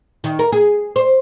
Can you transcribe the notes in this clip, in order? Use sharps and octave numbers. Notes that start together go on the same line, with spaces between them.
D#3
A#4
G#4
C5